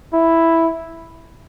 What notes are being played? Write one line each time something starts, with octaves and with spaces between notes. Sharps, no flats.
E4